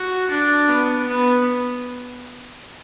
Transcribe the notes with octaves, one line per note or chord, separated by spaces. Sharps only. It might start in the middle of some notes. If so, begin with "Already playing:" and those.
Already playing: F#4
D4
B3
B3